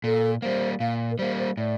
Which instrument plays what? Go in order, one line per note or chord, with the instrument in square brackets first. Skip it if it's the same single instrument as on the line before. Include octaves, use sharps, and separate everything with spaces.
[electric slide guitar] A#2 [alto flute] A4
[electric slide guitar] G3 A#3 [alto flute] C5
[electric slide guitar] A#2 [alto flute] F5
[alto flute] A#4
[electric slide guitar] G3 A#3 [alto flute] C5
[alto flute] C5
[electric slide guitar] A2 [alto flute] D5